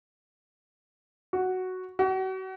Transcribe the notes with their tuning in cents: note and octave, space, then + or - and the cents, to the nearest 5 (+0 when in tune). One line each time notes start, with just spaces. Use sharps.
F#4 +0
F#4 +35